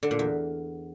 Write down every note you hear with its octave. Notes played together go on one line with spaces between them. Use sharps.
D3
A#2
E2